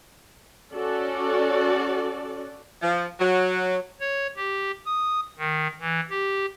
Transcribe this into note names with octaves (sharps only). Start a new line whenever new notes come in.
C#4 F#4 A4 D5
F3
F#3
C#5
G4
D#6
D#3
E3
G4